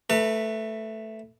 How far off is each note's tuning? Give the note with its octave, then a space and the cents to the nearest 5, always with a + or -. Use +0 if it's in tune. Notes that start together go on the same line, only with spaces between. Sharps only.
A3 +0 B4 +0 A5 +45